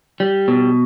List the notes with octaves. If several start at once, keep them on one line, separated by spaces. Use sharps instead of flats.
G3
B2